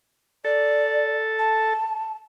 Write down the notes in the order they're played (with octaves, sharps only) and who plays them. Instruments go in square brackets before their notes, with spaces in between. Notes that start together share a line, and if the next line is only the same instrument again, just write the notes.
[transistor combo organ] A4 [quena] D5
[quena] A5